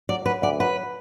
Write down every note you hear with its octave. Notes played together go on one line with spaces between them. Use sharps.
F#3 D5
F#3 B4
D2 D5
F#3 B4